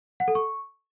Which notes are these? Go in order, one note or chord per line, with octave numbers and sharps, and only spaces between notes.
F#5
A4
C#6